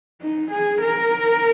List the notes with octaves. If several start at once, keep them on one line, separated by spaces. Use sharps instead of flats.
D#4
G#4
A#4